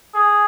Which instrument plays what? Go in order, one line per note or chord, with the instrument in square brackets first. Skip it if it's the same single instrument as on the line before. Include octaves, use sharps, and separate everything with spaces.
[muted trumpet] G#4